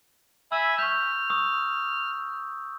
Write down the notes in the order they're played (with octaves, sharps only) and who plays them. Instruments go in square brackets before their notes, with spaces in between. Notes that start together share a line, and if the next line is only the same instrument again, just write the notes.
[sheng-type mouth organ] E5 G#5 B5 [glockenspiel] E6
[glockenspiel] C#6 G6 [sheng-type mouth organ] F6
[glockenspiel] C#6 D#6 E6